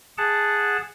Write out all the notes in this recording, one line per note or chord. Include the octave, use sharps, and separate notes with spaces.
G#4 F#5 A5